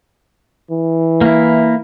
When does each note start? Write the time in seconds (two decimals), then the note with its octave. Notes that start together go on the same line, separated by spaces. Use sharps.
0.71 E3
1.21 A#3 E4